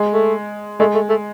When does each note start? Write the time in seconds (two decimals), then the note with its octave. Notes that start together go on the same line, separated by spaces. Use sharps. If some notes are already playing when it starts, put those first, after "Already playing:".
Already playing: G#3
0.13 A3
0.80 G#3 A3
0.94 A3
1.09 A3